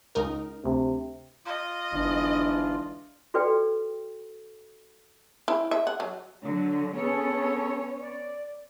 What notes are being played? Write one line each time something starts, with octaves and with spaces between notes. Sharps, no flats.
C#2 D#4 A#4
D2 C3
F4 D#5
G1 G#2 E3 D4
F#4 A4 B4 D5 G5
E4
E5
F#5
F#3
D3 F#3
B3 C#4 G#4 A4 C#5
D5